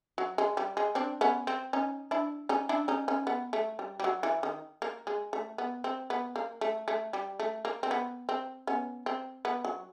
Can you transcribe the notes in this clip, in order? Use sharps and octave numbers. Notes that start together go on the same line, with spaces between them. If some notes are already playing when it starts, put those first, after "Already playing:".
F#3
G#3
G3
G#3
C4 D4
B3 C#4
C4
C#4 D#4
D4 E4
C#4 D#4
D4 E4
C#4 D#4
C#4 D#4
B3
A3
G3
G3
F#3
E3
D#3
A#3
G#3
A3
B3
C4
B3
A#3
A3
A3
G3
A3
A#3
C4
B3
C4
B3 C#4
C4
B3
F#3